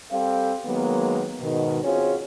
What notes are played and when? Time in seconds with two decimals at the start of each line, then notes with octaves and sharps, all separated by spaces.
0.11 G3 C4 G4 A4 F5
0.65 D#3 F#3 G#3 A#3 B3
1.40 G#2 B2 D#3
1.84 C4 C#4 F4 F#4 G#4 C#5